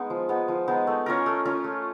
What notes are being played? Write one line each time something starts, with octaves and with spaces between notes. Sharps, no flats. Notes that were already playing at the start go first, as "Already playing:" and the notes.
Already playing: G#3 B3 D#4
F3
G#3 B3 D#4
F3
G#3 B3 D#4
A3
C#4 F4 A#4
A3
C#4 F4 A#4
A3